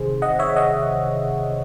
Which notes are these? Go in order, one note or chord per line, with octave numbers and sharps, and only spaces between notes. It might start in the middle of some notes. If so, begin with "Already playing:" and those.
Already playing: C3 D#3 G#4 C5
D#5 F#5
C#5 E5
D#5 F#5